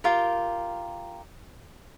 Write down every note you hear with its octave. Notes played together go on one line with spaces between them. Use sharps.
F4 G4 A#4